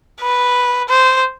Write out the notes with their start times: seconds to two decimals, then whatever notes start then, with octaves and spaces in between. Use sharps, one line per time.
0.21 B4
0.89 C5